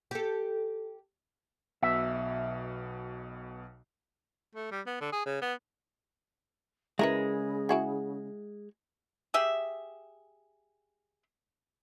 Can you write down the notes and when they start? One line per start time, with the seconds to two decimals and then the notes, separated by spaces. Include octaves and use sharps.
0.11 G4 A4
1.82 B1 B2 E5
4.55 A3
4.72 G3
4.87 B3
5.01 D3
5.13 G#4
5.26 C#3
5.42 B3
6.99 C#3 G#3 E4 A#4 B4
7.69 E4 F#4 G#4
9.34 G4 G#4 E5